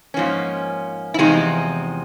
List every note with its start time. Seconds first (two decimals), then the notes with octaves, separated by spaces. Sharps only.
0.14 G#2 F3 A#3 C#4
1.14 E4
1.19 E2 C3 F3 G#3 C4 D#4